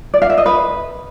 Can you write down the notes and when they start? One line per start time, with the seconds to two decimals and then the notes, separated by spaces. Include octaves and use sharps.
0.14 D5
0.22 F5
0.30 E5
0.38 D#5
0.46 B4